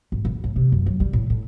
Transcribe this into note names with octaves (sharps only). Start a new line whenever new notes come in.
G#1
D1
A2
C3
F#2
F#3
G3
A2
A2